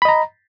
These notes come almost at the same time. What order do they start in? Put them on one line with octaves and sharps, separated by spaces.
B5 D#5 A#5